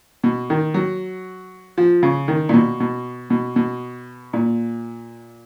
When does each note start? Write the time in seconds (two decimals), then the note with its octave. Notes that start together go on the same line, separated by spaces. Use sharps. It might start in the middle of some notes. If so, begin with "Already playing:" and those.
0.24 B2
0.50 D#3
0.74 F#3
1.78 F3
2.03 C#3
2.28 D#3
2.49 A#2
2.54 B2
2.80 B2
3.30 B2
3.56 B2
4.33 A#2